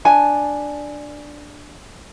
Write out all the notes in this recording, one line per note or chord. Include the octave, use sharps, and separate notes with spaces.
D4 G#5 A5